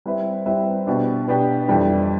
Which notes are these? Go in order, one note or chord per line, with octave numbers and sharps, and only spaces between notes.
G3 C4 E4 B4 E5
G3 C4 E4 B4 E5
B2 B3 D4 G4
B2 B3 D4 G4
F2 E3 G3 D4